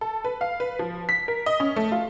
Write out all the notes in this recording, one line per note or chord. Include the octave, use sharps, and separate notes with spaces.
A4
B4
F5
B4
F3
B6
A#4
D#5
C#4
A3
F4